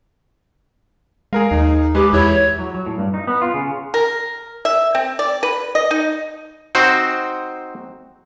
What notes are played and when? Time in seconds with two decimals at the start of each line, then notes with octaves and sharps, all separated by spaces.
1.33 G#3 G#4 A#4 F5
1.51 D#2 D#4
1.95 G#3 G4 B4
2.13 E2 E4 C#5
2.59 F#3
2.74 F#3
2.86 A2
2.98 G2
3.14 D#4
3.27 B3
3.42 F4
3.54 C#3
3.94 A#4
4.65 E5
4.95 C4
5.19 D5
5.43 B4
5.75 D#5
5.91 D#4
6.75 C4 D#4 F#4 C5